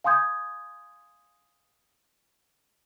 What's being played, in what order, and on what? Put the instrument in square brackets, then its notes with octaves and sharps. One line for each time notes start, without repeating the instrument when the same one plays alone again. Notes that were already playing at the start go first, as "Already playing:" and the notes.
[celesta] F5 G#5 C6 D#6 G6 G#6